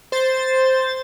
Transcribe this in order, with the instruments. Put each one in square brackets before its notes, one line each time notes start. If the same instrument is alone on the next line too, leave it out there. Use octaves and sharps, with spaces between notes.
[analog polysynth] C5 A6